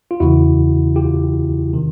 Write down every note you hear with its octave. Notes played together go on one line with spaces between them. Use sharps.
F4
E2 C#3 E3 E4 F#4
F4 G4
C3 D#3